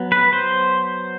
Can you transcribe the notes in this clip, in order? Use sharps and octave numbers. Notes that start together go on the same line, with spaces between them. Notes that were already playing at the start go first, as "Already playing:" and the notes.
Already playing: F#3 B3
B4
C5